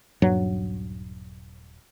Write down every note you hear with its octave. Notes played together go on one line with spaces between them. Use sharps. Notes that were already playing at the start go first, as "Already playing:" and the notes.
D#1 G2 F#3